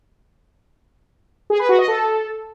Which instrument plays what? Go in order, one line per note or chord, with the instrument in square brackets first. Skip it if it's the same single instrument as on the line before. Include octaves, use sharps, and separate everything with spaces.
[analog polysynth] G#4
B4
F#4
D#5
A4